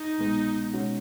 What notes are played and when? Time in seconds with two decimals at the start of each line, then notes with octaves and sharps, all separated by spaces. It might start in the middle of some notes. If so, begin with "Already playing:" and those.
Already playing: D#4
0.18 C2 B2 G#3 B3
0.74 B2 G#3 C#4 F#4